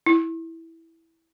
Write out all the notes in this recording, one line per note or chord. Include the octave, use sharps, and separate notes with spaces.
E4